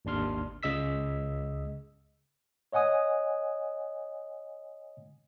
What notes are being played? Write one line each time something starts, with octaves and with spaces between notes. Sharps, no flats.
G#1 D#2 D4 C6 F6
C#2 C#3 D#5 E6 B6
C#5 D#5 F#5 G#5 D#6